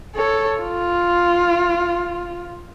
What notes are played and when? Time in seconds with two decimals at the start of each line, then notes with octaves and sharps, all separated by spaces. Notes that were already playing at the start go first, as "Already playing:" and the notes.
0.16 A4 C#5
0.59 F4